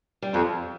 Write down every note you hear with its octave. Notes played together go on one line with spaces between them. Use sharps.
G3
F2 F3